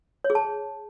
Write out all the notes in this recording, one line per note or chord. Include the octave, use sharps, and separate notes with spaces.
C#5
G#4
A5